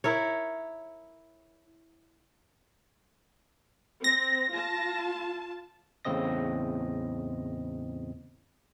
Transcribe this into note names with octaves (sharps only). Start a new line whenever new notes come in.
E4 A#4 C#5
C4 A#6
F4 A5
E2 A2 C#3 C4 D#5 A#6